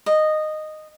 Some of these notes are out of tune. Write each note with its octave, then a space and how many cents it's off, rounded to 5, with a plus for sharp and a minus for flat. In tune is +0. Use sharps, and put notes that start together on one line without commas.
D#5 -10